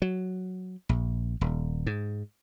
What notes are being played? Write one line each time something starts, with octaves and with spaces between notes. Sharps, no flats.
F#3
A#1
D#1
G#2